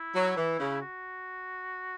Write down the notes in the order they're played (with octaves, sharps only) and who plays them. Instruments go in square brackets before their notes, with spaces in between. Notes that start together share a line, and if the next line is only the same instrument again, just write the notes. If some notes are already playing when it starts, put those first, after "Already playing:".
Already playing: [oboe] E4
[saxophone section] F#3
E3
C#3
[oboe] F#4